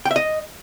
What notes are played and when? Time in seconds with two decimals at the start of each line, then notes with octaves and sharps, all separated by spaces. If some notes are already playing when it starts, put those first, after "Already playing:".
0.05 G5
0.11 E5
0.16 D#5